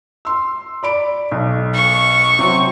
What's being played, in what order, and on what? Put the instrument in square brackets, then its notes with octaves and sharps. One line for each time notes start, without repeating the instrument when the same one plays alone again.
[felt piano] C6 E6
D5 B5 D7
B1
[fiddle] C#6
[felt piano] C3 F#3 C4